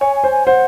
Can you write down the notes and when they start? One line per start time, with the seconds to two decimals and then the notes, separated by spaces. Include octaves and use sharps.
0.01 C#5 G#5
0.16 G#5
0.24 C5
0.31 G#5
0.46 C5 F#5